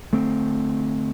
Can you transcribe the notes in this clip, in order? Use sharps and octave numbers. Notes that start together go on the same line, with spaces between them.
D3 A3 C4